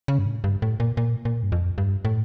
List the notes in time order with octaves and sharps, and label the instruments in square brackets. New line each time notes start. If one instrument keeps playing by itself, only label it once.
[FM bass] C#3
G2
A2
G2
A2
A#2
A#2
A#2
G2
F2
G2
A2